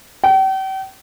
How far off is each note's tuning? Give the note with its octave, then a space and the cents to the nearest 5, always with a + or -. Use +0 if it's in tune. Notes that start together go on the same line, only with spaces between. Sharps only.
G5 -40